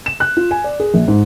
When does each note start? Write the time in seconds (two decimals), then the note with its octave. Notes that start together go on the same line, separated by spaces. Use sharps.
0.06 E7
0.20 F#6
0.37 F4
0.51 G#5
0.64 D5
0.80 G#4
0.94 A#1
1.08 G#2